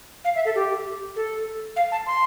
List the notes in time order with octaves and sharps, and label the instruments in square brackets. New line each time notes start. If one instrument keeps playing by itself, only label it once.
[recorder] F5
E5
A4
G4
A4
F5
A5
C6